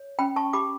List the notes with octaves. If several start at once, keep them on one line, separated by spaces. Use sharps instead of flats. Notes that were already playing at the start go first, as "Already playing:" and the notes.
Already playing: C#5
C#4 G5 B5
A5 C#6
G4 B5 D6